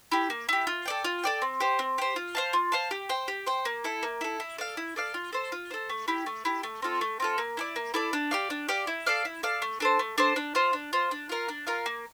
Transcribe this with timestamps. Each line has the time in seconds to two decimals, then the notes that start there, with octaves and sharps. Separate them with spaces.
0.11 E4 G4
0.30 A#3
0.49 E4 G4
0.67 F4
0.86 A4 D5 G5
1.04 F4
1.23 A4 D5 G5
1.42 C4
1.60 G4 C5
1.79 C4
1.98 G4 C5
2.16 F4
2.35 C5 F5 A5
2.53 F4
2.72 C5 F5 A5
2.91 G4
3.09 C5 G5
3.28 G4
3.46 C5 G5
3.65 A#3
3.84 E4 A4
4.03 A#3
4.21 E4 A4
4.40 E4
4.58 A4 D5 F5
4.77 E4
4.96 A4 D5 F5
5.14 F4
5.33 A4 C5
5.52 F4
5.71 A4 C5
5.90 A3
6.08 E4 G4
6.26 A3
6.45 E4 G4
6.63 A3
6.82 C4 F4 A4
7.01 A3
7.20 C4 F4 A4
7.38 A#3
7.57 E4 A4 D5
7.76 A#3
7.94 E4 A4 D5
8.13 D4
8.31 G4 D5 F5
8.50 D4
8.69 G4 D5 F5
8.87 E4
9.06 A4 D5 F5
9.25 E4
9.43 A4 D5 F5
9.62 A3
9.80 D4 A4 C5
9.99 A3
10.18 D4 A4 C5
10.36 D4
10.55 F4 C5
10.73 D4
10.93 F4 C5
11.11 D4
11.29 F4 A#4 F5
11.49 D4
11.67 F4 A#4 F5
11.86 A#3